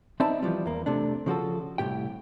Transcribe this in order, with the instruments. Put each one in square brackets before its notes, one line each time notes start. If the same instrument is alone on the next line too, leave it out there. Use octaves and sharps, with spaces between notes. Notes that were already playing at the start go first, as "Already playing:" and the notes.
[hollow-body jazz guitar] C4 D#4 D5 E5 A5 B5
E3 F3 G3
E2 A#3
C3 A3 D4
C#3 F3 F#4 A4
C2 A2 C3 G4 G5